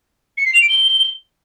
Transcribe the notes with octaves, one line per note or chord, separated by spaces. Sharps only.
C#7
C7
F7
D7
G7